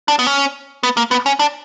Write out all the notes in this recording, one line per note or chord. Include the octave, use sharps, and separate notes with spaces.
D4
B3
C#4
B3
A#3
B3
C#4
D4